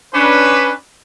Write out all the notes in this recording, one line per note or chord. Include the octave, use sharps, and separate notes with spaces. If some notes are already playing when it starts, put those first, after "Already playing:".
C#4 D4 B4